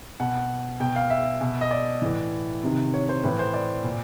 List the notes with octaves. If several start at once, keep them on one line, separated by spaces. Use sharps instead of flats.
B2 F#5
B2 G5
F5
E5
B2
D#5
D5
A2 E3
C3 D#3
C#5
C5
A2 E3 B4
C5
D5
A#2